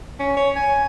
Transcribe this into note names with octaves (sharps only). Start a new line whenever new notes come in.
C#4
C#5
G#5